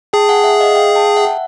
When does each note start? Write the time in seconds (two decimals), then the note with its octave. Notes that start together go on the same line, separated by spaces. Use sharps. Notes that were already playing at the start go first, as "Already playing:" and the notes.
0.13 G#4 G5 A5
0.29 F#5 G#5
0.44 E5 F#5
0.60 D#5 F5
0.75 F5 G5
0.95 G5 A5
1.16 E5 F#5